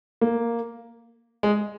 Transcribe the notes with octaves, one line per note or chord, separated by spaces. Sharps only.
A#3
G#3